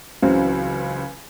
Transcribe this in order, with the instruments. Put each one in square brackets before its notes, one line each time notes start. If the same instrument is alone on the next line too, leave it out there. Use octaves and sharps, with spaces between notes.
[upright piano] C#2 C#3 E3 F#3 C4